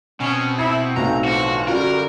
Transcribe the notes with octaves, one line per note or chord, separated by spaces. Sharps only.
B2 C4 C#4
E4 G#6 C7 C#7
B1 A2 E3 A3 F#5 A#5
D3 E3 F3 F#4
F#2 D3 G3 F4 F#4 A#4